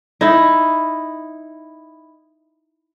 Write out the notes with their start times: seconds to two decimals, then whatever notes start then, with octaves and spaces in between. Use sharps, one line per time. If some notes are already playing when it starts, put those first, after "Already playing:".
0.21 D#4 E4